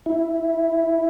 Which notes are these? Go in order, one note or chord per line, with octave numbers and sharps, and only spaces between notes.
E4